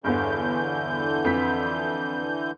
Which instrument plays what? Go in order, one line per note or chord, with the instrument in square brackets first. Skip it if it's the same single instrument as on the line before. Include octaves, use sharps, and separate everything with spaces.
[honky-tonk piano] G1 E2 G2 [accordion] D3 E3 G6
[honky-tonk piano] F2 B6